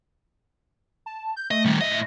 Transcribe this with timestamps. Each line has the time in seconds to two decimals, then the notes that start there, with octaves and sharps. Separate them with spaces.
1.06 A5
1.36 G6
1.51 A3 D#5
1.65 D#3 G3
1.81 A2 D#5 E5